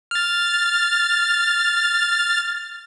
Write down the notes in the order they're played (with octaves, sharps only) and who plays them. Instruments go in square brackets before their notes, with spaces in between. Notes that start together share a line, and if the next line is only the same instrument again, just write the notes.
[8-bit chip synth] F6 A6